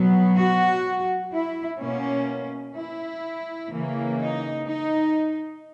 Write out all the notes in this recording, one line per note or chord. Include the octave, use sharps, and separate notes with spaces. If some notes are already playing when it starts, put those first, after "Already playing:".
Already playing: B2 F#3 B3
F#4
E4
B2 A#3 C#4
E4
C#3 E3 A#3
D#4
D#4